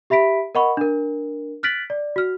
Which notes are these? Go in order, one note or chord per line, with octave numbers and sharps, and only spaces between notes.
G4 E5 B5 B6 D7
A#4 D#5 F#5 B5 C#6
D4 A#4
F6 F#6 A6 B6 D7 F#7
D5
F#4 F6